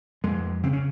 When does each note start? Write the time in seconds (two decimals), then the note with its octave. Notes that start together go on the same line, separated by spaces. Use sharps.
0.24 F2 G#3
0.63 C#3 C4
0.73 C#4